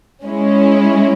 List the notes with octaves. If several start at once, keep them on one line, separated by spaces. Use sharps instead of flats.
G#3 C#4 E4